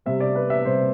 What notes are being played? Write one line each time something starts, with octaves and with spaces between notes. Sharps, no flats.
C3 G3 C4 E5
D5
B4
E5
C3 G3 C4 C5